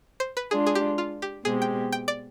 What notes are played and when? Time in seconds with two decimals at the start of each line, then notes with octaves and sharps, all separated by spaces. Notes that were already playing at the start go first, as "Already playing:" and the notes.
0.20 C5
0.37 B4
0.51 G#3 D4 F4 G#4
0.66 G#4
0.75 G4
0.98 F4
1.22 G4
1.45 B2 G#3 C4 G4 G#4
1.62 G5
1.92 G5
2.08 D5